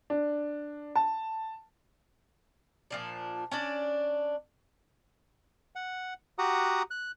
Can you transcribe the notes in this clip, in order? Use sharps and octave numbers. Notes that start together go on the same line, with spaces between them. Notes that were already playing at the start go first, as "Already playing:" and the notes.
D4
A5
A#2 F3 D4
C#4 D4 D5
F#5
F#4 G4 F#5 A#5 D#6
F#6